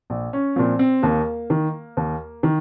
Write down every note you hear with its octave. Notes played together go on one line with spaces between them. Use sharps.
A#1
C#4
A#2 F3 C4
C4
D#2 A#3
D#3
D#2
D#3